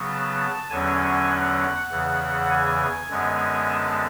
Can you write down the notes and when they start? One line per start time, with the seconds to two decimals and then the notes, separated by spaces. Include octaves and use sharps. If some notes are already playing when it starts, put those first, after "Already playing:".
Already playing: C#3 F#3 B3
0.10 A5
0.40 A5
0.70 E2 D3 F#3 C#4 G#5
1.29 F#5
1.90 E2 C#3 E3
2.50 G#5
3.10 F#2 D3 G#3 B3
3.69 A5